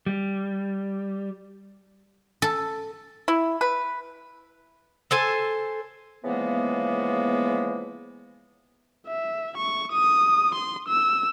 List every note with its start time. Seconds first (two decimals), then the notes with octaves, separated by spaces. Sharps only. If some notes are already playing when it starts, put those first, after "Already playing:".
0.06 G3
2.42 A4
3.28 E4
3.61 B4
5.11 A4 C5 G#5
6.24 C#3 E3 F3 G#3 A#3 B3
9.07 E5
9.57 C#6
9.92 D#6
10.55 C6
10.88 E6